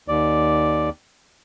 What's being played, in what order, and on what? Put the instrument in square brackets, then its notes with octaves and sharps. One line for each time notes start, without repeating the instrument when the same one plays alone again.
[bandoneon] D#2 D5